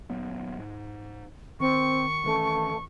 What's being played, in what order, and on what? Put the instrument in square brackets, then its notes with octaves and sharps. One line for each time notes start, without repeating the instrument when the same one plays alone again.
[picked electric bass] D#1 F#3 B3
G#2
[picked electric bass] D#3 [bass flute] C4 [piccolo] C#6
[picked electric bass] D#3 E3 C#4 [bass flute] A3